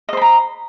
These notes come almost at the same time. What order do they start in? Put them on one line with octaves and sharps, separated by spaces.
D#5 C5 B5 A#5